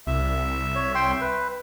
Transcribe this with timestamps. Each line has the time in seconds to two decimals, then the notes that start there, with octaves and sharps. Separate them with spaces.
0.07 C2 E5
0.75 C#5
0.95 G5 C6
1.21 B4